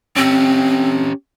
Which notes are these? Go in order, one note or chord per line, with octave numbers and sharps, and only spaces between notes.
C4 C#4 G4